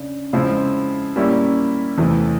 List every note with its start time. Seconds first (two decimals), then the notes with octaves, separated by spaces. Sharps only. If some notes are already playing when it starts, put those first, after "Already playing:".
Already playing: C#3 D4
0.33 C#3 F3 G#3 C4 E4
1.16 A#2 G3 A#3 C#4 E4
1.98 E2 C3 E3 A3